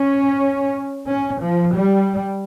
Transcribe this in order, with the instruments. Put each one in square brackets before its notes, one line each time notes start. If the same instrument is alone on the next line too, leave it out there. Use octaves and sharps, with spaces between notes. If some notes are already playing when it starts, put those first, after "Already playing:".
Already playing: [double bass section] C#4
C#4
F3
G3